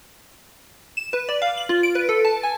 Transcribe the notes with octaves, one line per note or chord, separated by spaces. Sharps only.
E7
B4
D5
F5
F#7
F4
D7
B4
A4
A5
G#5